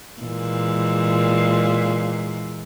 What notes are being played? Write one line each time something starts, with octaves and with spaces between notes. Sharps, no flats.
A#2 E3 G#3